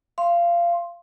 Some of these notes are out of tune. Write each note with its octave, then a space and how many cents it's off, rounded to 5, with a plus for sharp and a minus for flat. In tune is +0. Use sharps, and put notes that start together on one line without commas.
F5 -20 C6 +5